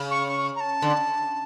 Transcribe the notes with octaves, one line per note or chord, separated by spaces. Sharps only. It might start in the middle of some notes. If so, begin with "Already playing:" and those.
Already playing: C#3
C#6
C#6
A#5
A5
D3